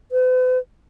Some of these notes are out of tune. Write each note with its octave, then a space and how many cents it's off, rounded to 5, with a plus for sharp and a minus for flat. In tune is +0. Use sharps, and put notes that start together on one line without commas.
B4 +45